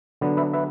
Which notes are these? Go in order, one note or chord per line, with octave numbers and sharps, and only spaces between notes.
D3 F#3 B3 D4
B4 E5
B4 E5